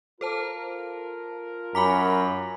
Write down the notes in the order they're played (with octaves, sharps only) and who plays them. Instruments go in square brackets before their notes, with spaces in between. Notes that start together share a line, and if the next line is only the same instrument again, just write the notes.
[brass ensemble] F4 A#4 [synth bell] A4 C5 A5
[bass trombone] F#2 [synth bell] G#5 D6 B6 [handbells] A#5 B5